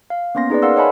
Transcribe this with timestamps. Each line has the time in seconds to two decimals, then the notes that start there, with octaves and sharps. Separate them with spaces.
0.10 F5
0.35 A#3 B3 C#4 C6 A#6
0.50 D#4 G#4 B4 D5
0.62 A#4 D5 F5 F#5 C6 E6
0.76 C#5 D#5 F#5 G#5 A5 B5